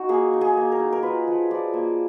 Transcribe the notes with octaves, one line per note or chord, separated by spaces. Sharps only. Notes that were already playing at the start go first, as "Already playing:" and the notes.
Already playing: D#4 F#4
A#3 G#4
D#4
G#4
A#3
A#4
D#4
A#4
F4 B4
F3
F3 D5
A#3